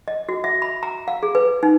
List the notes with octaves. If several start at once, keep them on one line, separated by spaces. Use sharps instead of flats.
D#5
F#4
E5
B5
A#5
F5
G#4
B4
D#4